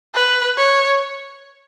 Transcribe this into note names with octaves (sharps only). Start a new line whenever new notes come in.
B4
C#5